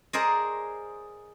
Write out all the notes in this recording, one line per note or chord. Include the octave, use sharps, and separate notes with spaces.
G#4 A#4 C5 D5 D#5